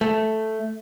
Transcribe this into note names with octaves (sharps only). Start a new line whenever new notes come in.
A3